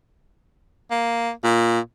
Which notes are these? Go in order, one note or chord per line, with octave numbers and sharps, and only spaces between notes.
A#3
A#2